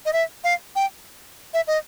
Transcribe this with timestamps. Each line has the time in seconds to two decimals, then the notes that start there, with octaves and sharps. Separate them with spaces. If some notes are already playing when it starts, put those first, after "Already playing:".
0.06 D#5
0.13 E5
0.44 F5
0.76 G5
1.54 E5
1.67 D#5